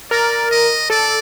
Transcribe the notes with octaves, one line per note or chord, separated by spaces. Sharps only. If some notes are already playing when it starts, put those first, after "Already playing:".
A#4 D5
D#5
A4 D5